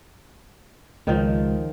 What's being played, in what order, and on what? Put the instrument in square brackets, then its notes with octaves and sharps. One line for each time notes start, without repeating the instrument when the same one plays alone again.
[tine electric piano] C#2 G#3 [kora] D#3 F3